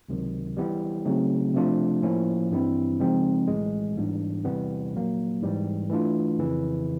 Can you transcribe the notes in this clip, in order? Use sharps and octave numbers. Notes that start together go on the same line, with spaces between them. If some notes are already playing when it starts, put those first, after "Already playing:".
C#2 C3 D#3 F#3
E3 G3 B3 E4 G4
C#3 F#3 A3 C4 D#4
C3 F3 A3 D4 F4
A2 F3 A#3 C#4 E4
G2 E3 G3 C4 E4
C#3 F3 G#3 C4 D#4
B1 A2 E3 G#3
G#2 E3 G3 B3 D4
E2 C3 E3 G3 B3
A#1 A#2 F#3 A#3
G#2 E3 G3
E3 A3 D4 F4
F2 C#3 E3